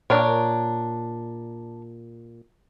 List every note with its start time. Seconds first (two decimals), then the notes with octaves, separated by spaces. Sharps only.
0.10 A#2 D4 A#4 C#5